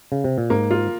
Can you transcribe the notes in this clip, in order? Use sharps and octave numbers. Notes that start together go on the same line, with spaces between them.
C#3
C3
A#2
G#2 A#3
F4